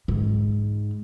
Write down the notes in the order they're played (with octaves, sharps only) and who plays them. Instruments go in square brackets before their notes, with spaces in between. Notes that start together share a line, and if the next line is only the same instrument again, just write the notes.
[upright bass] G#2